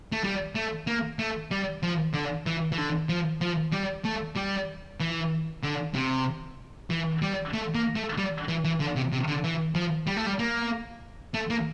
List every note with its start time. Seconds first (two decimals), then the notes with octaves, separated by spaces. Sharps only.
0.12 A3
0.24 G3
0.55 A3
0.87 A#3
1.19 A3
1.51 G3
1.83 F3
2.14 D3
2.46 E3
2.72 E3
2.78 D3
3.09 F3
3.41 F3
3.72 G3
4.05 A3
4.36 G3
5.00 E3
5.63 D3
5.94 C3
6.90 E3
7.22 G3
7.54 A3
7.75 A#3
7.96 A3
8.18 G3
8.48 E3
8.65 E3
8.80 D3
8.96 C3
9.12 C3
9.28 D3
9.44 E3
9.75 F3
10.07 G3
10.17 A3
10.26 G3
10.39 A#3
11.34 A3
11.50 A#3